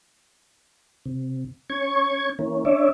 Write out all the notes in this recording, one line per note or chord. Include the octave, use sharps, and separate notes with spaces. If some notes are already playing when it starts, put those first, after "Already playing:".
C3
C#4 C#6 G#6
E3 A#3 C#4
C#4 D4 C#5 D5 E5